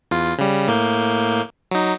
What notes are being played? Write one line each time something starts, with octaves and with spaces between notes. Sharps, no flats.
E2 F4
C#3 G3
A2 A#3 G6
F#3 D#4